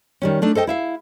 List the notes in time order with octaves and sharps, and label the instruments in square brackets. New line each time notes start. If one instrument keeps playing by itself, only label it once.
[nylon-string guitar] D#3 G3 C#4
A3 D4 D#4
A4 C5 D#5 G5
E4 E5 F5